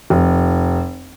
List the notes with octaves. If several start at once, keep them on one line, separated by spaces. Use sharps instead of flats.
F1